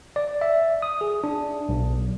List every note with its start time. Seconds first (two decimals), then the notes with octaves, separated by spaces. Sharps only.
0.16 D5
0.41 E5
0.82 D#6
1.01 G#4
1.24 D4
1.69 B1